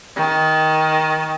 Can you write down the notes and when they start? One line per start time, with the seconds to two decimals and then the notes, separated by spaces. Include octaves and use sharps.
0.16 D#3